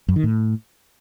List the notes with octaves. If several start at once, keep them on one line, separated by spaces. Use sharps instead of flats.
F#2
D#3
A2